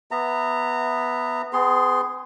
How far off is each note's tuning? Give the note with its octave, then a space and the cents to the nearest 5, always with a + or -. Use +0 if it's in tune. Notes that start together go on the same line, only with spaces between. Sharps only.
B3 +0 E5 +0 A#5 -25
B3 +40 G#4 +0 C6 +0